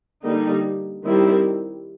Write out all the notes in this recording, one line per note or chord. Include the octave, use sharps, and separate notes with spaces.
D3 G3 A#3 D#4
D#3 G3 C4 E4 G4